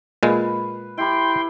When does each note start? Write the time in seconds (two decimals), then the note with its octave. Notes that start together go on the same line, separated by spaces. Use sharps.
0.23 A#2 G#3 B4 F5 B5
0.98 E4 G4 G5 B5 C6